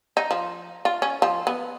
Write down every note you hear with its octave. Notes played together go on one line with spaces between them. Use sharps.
D#4
F3
F4
C#4
F3
B3